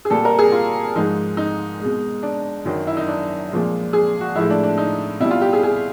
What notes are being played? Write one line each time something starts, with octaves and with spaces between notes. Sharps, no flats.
G#4
A#2 G3 A4
A#4
G#4
F4
G#2 F3 G#3 D#4
D#4
B2 G#3
D4
F#2 D#3 F#3
E4
D#4
D4
A#2 F3 G#3
G#4
F#4
A2 F3 G#3 E4
D4
D4
D#4
B2 G3 E4
F4
G4
G#4
G#4